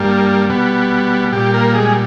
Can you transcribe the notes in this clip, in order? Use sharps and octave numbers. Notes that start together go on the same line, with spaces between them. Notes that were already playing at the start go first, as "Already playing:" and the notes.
Already playing: G2 G3 A#3
B2 G3 B3
A#2 G3 G4
A#3 A#4
G#3 G#4